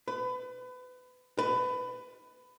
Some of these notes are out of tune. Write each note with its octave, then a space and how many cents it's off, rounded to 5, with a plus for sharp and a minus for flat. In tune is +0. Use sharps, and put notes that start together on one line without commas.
B4 +30
B4 +20